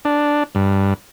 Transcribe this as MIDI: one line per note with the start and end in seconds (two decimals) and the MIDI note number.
0.05 0.43 62
0.55 0.94 43